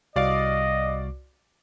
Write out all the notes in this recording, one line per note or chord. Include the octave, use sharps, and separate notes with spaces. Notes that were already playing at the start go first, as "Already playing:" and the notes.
C2 F#4 D5 D#5 F5 D6